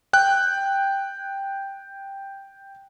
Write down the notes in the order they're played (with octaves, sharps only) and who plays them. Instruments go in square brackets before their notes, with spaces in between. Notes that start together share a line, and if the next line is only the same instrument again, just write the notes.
[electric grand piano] G5 F#6